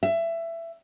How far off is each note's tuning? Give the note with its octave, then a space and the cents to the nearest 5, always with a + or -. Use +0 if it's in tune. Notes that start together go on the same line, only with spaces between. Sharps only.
E5 +20